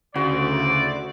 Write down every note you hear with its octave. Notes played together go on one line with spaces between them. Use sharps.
D2 C#3 E4 F#4 C5 D5